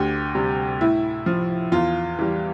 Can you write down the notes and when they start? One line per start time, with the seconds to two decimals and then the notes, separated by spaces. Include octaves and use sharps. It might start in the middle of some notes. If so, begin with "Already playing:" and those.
Already playing: D2 G4
0.35 C3 G3
0.81 A2 E4
1.26 F3
1.72 E2 F4
2.19 E3 G3